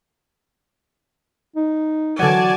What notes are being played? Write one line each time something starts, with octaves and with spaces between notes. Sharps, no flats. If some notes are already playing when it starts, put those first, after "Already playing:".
D#4
D3 E3 F#3 F#4 D5 G#5 A5